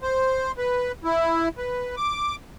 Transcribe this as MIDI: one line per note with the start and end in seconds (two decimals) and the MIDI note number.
0.02 0.52 72
0.58 0.92 71
1.04 1.48 64
1.58 1.95 71
1.97 2.35 86